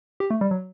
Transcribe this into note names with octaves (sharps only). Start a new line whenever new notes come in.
G4
A3
G3
F#3